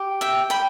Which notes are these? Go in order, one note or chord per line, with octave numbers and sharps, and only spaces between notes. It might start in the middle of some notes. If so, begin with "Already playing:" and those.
Already playing: G4
E5 G5
G5 B5